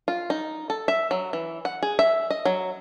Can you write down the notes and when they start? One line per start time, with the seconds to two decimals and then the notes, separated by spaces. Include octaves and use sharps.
0.08 F4
0.30 D#4
0.70 A4
0.88 E5
1.11 F#3
1.33 E3
1.65 F#5
1.83 G#4
1.99 E5
2.30 D#5
2.45 F#3